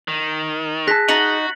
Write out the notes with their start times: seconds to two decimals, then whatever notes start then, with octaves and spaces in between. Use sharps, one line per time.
0.08 D#3
0.87 G#4 A5 F#6 A#6 B6
1.09 D#4 F#4 A6 C#7 F#7